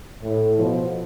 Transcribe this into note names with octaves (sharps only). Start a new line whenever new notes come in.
A2
B2 F3